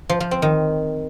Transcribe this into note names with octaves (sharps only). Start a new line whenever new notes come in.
F3
F3
C4
D#3